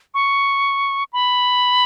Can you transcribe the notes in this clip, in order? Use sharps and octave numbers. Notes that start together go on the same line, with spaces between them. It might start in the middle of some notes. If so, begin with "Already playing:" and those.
C#6
B5